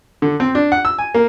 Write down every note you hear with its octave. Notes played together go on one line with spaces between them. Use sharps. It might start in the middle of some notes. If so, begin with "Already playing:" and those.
D3
C4
D4
F#5
E6
G#5
A#3